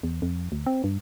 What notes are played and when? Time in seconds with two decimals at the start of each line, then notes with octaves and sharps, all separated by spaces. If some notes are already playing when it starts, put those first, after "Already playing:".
0.03 E2
0.22 F2
0.52 D2
0.66 C4
0.84 G2